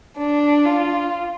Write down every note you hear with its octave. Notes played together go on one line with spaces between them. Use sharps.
D4
F4